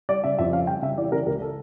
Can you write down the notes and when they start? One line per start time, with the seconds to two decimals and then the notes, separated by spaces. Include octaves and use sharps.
0.09 G3 D5
0.24 C#3 E5
0.39 F2 E5
0.53 C#4 F5
0.67 G3 G5
0.82 C#3 E5
0.98 E3 D5
1.12 C#3 A#4
1.26 C#2 A#4
1.42 A4